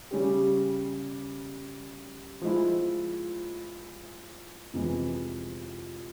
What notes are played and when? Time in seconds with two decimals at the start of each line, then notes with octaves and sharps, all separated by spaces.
0.11 C#3 G3 C#4 G4
2.41 F3 G#3 E4
4.74 F2 C3 E3 G#3